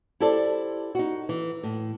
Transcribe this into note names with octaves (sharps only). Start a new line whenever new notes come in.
E4 G4 A4 C5 D5
D#4 F#4
E3
A2